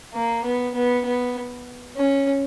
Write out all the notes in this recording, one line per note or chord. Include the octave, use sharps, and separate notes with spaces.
A#3
B3
B3
B3
C#4